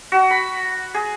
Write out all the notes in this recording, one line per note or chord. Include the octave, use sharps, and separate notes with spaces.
F#4
B5
G#4